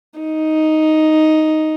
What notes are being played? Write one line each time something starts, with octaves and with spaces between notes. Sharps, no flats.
D#4